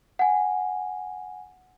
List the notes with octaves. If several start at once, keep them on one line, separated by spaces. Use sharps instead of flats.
F#5 G#5